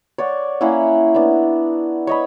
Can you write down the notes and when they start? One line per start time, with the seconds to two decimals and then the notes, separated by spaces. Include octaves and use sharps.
0.18 C#5 D5 F#5
0.61 A#3 C#4 E4 F#5
1.14 B3 D4
2.07 C#5 D#5 B5